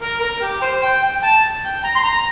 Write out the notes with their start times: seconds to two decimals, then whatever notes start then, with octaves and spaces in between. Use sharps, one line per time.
0.01 A#4
0.21 A#4
0.41 G4
0.62 C5
0.83 G5
1.03 G5
1.23 A5
1.64 G5
1.84 A#5
1.95 C6
2.04 A#5